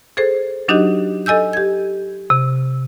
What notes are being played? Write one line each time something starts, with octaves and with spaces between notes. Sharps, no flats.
G#4 A4 C5
F#3 D4 D#4 F#4 G4 D#5
A4 D#5 G#5 E6 G6
G4 G#6
C3